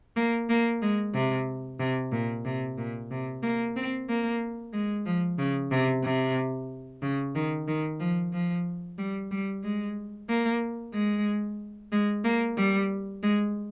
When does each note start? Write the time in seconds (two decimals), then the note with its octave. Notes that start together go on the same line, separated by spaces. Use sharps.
0.16 A#3
0.50 A#3
0.82 G#3
1.14 C3
1.80 C3
2.12 A#2
2.45 C3
2.78 A#2
3.11 C3
3.43 A#3
3.76 C4
4.09 A#3
4.73 G#3
5.06 F3
5.39 C#3
5.71 C3
6.04 C3
7.02 C#3
7.35 D#3
7.68 D#3
8.00 F3
8.33 F3
8.98 G3
9.31 G3
9.64 G#3
10.29 A#3
10.94 G#3
11.92 G#3
12.24 A#3
12.57 G3
13.23 G#3